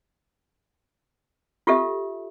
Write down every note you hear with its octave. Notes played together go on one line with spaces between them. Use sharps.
F4 G4 A4 E5